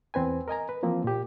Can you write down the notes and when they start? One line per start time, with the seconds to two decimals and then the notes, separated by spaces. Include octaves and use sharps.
0.14 E2 C4 B4 G#5
0.48 A#4 D#5 G#5 A#5
0.69 B4
0.83 E3 F3 A#3 C4
1.04 A#2 G4